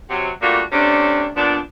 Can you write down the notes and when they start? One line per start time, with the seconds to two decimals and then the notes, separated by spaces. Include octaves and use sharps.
0.10 C3 F#3
0.42 G3 A3 A#3 D4 F4 F#4
0.72 C3 A3 C#4 D4
1.37 A#2 F3 B3 D4